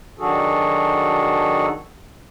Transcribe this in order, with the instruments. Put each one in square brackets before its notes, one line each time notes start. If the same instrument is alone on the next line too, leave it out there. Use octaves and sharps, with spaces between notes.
[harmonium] D#3 F#3 D4 F#4 G#4 A4